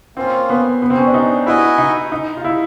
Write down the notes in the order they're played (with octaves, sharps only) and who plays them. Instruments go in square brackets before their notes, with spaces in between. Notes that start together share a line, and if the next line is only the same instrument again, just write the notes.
[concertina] A#3 C#4 F4 [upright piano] C4
[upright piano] B3
B3
C4
C#4
D4
D#4
[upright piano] E4 [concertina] F#4 B4 D#5 G#5
[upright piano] D#4
D#4
F4
E4